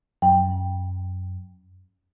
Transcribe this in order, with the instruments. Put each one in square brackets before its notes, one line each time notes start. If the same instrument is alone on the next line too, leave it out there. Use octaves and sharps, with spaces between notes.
[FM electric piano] F#2 [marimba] G5